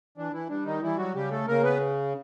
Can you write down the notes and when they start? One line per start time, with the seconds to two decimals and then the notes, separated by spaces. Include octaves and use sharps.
0.17 E3 D4
0.33 E3 E4
0.49 G3 D4
0.66 D#3 D#4
0.82 E3 G3 E4
0.98 F#3 F#4
1.15 C#3 G3 G4
1.31 A3 A4
1.47 C#3 A#3 A#4
1.63 B3 B4